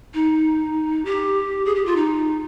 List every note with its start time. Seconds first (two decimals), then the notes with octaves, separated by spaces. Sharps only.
0.14 D#4
1.05 G4
1.65 G#4
1.75 G4
1.86 F4
1.96 D#4